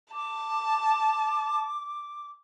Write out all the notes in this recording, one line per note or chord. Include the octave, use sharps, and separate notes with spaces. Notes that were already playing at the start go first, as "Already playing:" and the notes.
A5 D6